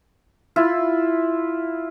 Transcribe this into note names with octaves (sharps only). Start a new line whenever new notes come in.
E4 F4